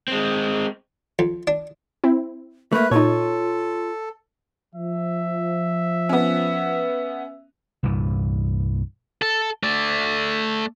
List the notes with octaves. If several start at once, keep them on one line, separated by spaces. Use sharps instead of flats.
G#3 C4
F2
D4
C4 E4
A3 A#3 B4 E5
A#2 D#4 F4 A4 C#5
F3 E5
B3 C#4
C2 G2 A#2 E3
A4
A3 D5